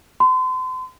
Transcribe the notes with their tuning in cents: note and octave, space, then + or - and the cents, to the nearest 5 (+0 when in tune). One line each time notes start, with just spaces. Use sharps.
C6 -40